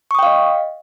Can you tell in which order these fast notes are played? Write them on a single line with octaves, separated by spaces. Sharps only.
C#6 D#6 G5 F5 D#5